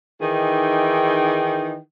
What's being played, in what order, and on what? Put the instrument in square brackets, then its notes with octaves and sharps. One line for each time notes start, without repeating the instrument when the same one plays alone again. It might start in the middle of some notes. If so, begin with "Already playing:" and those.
[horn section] D#3 E3 D#4 G#4 G5